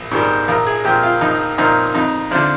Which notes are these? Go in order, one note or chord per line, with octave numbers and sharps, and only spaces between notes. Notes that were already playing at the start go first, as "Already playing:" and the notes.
Already playing: A#1
G#2 D#3 G3
A#1 A#4
G#4
A#2 F3 G4
F4
A#1 D#4
A#2 F3 D#4
F2 D#4
D3 F3 D4